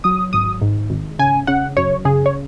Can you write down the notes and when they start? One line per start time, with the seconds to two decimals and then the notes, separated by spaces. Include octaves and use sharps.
0.04 F#3 D#6
0.33 G#1 D#6
0.61 G#2
0.90 G#1
1.19 C#3 G#5
1.47 C#3 F#5
1.77 F#2 C#5
2.05 C#3 G#4
2.26 C#5